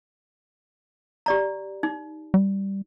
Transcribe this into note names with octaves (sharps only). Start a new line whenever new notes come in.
G4 D5 A#5
D#4
G3